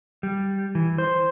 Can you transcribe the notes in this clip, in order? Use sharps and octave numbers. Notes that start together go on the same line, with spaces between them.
G3
E3
C5